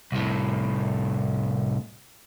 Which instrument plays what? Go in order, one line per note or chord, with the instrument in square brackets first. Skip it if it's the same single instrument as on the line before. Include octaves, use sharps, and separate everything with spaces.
[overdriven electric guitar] C2 A2